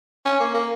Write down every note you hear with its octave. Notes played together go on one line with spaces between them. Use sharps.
C#4
A#3
A#3